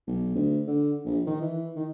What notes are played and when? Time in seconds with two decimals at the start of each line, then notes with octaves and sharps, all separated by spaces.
0.07 B1
0.35 D2
0.67 D3
1.05 A#1
1.27 D#3
1.41 E3
1.76 D#3